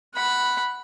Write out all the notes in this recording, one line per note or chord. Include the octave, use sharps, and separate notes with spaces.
F#5 B5